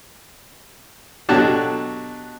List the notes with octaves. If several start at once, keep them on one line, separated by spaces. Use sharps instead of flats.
B2 F#3 D4 F#4 G4 A4